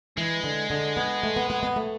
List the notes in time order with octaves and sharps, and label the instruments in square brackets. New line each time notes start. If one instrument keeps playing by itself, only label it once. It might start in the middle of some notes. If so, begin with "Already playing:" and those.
[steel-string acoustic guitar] E3 [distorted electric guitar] G#3
[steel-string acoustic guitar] D3
D3
B3
A3
B3
B3
B3
A3